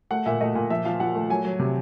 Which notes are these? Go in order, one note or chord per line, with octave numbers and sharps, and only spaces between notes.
A3 F#5
A#2 E5
A3 D#5
A#2
F3 E5
F3 F5
F3 F#5
A3
F#3 G#5
F#3
C3